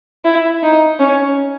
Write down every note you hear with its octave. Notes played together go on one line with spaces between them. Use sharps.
E4
D#4
C#4